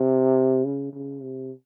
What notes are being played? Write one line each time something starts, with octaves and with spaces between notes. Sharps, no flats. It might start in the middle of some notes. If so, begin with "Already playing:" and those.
Already playing: C3
C#3
C#3
C3